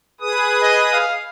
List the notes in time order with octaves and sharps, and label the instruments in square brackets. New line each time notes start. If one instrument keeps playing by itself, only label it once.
[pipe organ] G#4 B4 D#6
[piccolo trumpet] D#5
F5